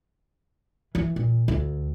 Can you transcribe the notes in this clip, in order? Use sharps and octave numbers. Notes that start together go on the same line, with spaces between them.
E3
A#2
D2